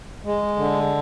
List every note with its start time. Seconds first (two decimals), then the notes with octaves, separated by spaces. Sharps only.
0.24 G#3
0.56 D3